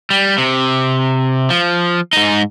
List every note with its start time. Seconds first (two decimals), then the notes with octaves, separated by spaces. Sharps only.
0.10 G3
0.38 C3
1.50 F3
2.13 G#2 D#4